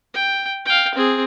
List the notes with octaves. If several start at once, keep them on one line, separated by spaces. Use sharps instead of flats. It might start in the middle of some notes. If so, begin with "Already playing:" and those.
G5
F5 G5
C4 G#4